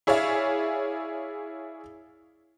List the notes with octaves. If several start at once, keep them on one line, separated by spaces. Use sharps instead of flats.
E4 G#4 C#5 D5 E5 F5